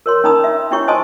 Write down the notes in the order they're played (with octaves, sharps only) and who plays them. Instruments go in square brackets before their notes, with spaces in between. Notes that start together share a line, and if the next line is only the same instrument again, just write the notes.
[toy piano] A#4 C#5 C6
C#4 D#4 A#4 A#5 B5 D#6
E5
C#4 D4 E4 G4 C#5 C#6
C5 D#5 G#5 A5 C6 D#6